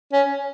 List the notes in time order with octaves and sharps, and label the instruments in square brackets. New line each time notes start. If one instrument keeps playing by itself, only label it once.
[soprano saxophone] C#4